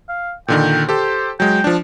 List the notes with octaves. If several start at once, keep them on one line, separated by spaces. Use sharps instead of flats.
F5
A#2 D3 D#3 G5
G4 A4 C5
F#3 G#3 G5
F3 D4